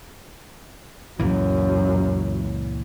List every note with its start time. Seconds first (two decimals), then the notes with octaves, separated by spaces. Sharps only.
1.20 C#2 F#2 A#2 E3 F#3